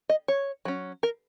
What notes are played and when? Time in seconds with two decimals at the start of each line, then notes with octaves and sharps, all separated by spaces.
0.09 D#5
0.28 C#5
0.65 F#3 C#4
1.03 A#4